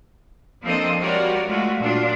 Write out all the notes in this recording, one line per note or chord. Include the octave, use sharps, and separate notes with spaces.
F3 A#3 C4 D4 A4 D#5
G3 F4 F#4 A#4 C#5 D5
G#3 A3 F4 F#4
A#2 F#3 D4 F4